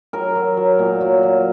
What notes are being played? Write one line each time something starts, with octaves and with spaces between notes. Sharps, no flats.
F#3 A#4
F#3
F#3
A#2
F#3
F#3